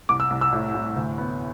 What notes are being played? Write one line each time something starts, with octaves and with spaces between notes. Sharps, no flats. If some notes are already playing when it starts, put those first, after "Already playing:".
C2 D6
E6
C2
E6
A2
A2
D2
B3